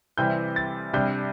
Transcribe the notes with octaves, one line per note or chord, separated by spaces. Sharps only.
C3 E3 G3 C4 G6
A6
C3 G3 D4 G6